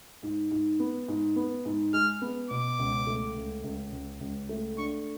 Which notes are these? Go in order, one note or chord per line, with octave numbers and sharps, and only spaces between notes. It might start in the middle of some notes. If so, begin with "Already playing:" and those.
G#2
G#2
B3
G#2
B3
G#2
G#3 F6
B3
B2 D6
C#2
A3
C#2
C#2
C#2
C#2
A3
D4 C#6